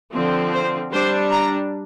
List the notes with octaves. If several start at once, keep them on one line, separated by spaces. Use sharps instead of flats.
D3 F3 C4
C5
G3 D4 C5
A#5